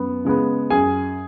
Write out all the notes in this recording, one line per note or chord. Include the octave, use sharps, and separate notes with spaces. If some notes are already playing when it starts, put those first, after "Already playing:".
Already playing: F#2 B3
C#3 G#3 B3
F#2 G#4 G#5